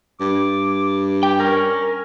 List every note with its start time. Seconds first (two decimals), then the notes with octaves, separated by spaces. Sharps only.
0.20 G2 D6
1.23 G4 G5
1.40 C#4 A#4